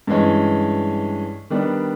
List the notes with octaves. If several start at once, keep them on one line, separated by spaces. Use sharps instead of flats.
G2 E3 G#3 C#4
D#3 G3 B3 D4